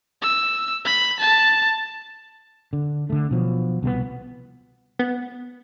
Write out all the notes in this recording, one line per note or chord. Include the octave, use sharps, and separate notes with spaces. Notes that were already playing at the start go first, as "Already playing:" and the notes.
E6
B5
A5
D3
D3 A3
B2 F3 F#3
C2 B2 D3 B3
B3